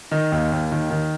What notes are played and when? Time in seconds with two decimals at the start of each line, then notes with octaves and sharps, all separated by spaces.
0.11 D#3 D#5
0.32 D#2
0.52 D#2
0.72 D#3
0.90 D#3